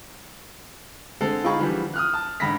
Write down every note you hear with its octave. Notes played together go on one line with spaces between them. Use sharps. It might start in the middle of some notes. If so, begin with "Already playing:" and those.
D3 G#3 C4 A4
D#4 F4 G#4 G5 B5 C#6
D3 E3 F3 G3
D#6 F6 F#6
A5
A1 G#2 D3 B5 A#6 B6